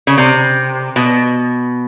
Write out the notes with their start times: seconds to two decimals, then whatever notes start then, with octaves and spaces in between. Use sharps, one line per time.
0.07 C#3
0.18 C3
0.96 B2